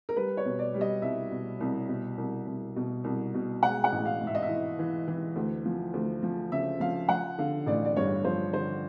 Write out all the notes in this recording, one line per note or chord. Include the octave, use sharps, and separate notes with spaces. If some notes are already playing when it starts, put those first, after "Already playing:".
A#4
G3 B4
C#5
B2
D5
G3
D#5
C2 E5
B2
C2
B2
C2
C2
B2
C2
B2
G#3 F#5
F#5
A1
F5
G#2
E5
D#5
E5
E3
E3
E3
D2
F3
D2
F3
C#3 E5
F3 F5
F3 F#5
D3 F5
A1 D5
D5
G2 C#5
F3 C5
D3 C5